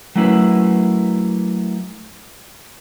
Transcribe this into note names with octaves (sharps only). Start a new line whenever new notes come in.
F#3 A3 A#3 C#4 E4 B4